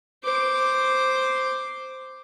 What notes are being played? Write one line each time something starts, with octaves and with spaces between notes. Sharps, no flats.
C5 D6